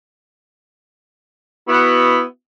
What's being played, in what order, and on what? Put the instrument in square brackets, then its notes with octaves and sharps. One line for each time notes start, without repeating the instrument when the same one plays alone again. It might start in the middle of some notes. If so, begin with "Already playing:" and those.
[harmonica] B3 E4 F#4